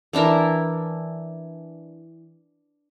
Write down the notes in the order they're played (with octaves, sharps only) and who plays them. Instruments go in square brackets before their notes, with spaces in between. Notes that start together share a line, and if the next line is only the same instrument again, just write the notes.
[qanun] E3 D4 E4 A#4